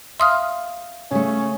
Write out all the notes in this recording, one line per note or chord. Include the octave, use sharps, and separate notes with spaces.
E5 F5 C6 D#6 F6
C#3 A3 C#4